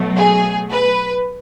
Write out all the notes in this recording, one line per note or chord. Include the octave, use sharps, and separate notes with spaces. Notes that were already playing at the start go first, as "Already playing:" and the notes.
Already playing: B2 F#3 A3
G#4
B4